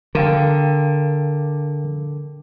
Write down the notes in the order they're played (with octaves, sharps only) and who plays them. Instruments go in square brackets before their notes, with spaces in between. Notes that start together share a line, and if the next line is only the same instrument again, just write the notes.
[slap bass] D3 [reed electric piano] A#4 F5 G5